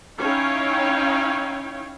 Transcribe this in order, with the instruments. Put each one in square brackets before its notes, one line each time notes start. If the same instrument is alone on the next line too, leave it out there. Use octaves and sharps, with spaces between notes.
[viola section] C#4 D#4 E4 C#5 F5 G5